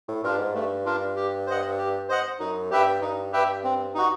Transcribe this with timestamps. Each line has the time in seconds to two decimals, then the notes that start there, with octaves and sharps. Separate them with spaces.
0.08 A2
0.24 G2 D4 F4 A#4
0.39 G#2
0.54 G2 A3
0.85 D4 F4 A#4
1.16 G4
1.47 C5 D#5 F#5
1.78 G4
2.09 C5 D#5 F#5
2.40 F#2 D#4
2.71 G2 G4 B4 E5 G5
3.02 G2 D#4
3.32 G4 B4 E5 G5
3.64 C4
3.94 D#4 F#4